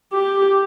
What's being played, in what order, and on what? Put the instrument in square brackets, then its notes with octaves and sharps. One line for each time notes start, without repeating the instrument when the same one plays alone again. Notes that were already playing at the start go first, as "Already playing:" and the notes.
[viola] G4